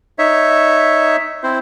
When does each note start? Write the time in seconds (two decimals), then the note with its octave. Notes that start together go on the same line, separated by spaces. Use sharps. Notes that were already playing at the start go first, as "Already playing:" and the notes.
0.19 D#4 C#5 E5
1.43 C4 E4 C5